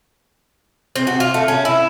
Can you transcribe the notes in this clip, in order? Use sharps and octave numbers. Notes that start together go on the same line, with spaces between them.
C4
F#4
F4
A3
C#4
E4